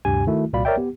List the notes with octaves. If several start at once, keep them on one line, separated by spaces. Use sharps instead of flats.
D2 G2 C3 G4 G#5
D#3 A3 E4 F#4
C2 A#2 F#4 D5 F5 B5
A#4 C#5 D5 E5 G5
B3 G4